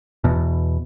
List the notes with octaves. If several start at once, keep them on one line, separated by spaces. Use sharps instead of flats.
E2 B2